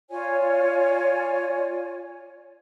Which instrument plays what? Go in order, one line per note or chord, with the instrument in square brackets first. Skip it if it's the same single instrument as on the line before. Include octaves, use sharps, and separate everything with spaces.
[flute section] F4 C#5 D5 G#5